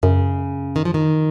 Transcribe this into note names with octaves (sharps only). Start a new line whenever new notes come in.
F#2 C#3
D#3
F3
D#3